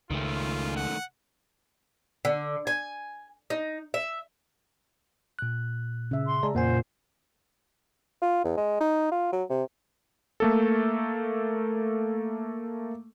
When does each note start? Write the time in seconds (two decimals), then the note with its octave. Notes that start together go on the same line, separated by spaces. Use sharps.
0.10 C#2 D#3 A3 F4
0.76 F#5
2.25 D3
2.67 G#5
3.50 D#4
3.94 E5
5.39 A#2 F#6
6.11 C#3 E5
6.26 C6
6.43 G#3 D5 A5 A#5
6.55 F2 A#2 C5 F#5 G#5
8.22 F4
8.44 E2
8.57 G#3
8.80 D#4
9.12 F4
9.33 F#3
9.50 C3
10.40 A3 A#3 A4